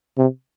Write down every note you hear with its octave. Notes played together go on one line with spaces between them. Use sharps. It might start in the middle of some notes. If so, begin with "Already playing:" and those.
C3